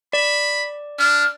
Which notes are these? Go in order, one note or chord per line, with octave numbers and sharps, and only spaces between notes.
D5 B5
D4 F6